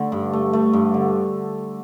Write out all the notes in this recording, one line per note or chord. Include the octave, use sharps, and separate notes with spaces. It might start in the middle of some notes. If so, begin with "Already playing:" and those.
Already playing: D3 A3
G2
A3
A3
G2
D3